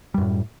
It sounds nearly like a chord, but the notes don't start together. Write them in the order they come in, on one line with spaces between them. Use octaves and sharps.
G3 F#2 A2